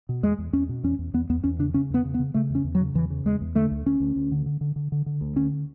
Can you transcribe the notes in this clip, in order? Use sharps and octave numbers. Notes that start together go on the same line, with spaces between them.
B2
E2 G#3
E2
E2 C#4
B2
E2 C#4
E2
E2 B3
E2 B3
E2 C#4
C#3 D4
C#3 C#4
E2 B3
C#3
B3
C#3
C#3 A3
E2
C#4
E2
F#3
C#3
E2 E3
C#3
E2 G#3
E2
D3 A3
D2
D2 C#4
D2
D2
D3
D3
D3
D3
D3
D3
D2
D3 C#4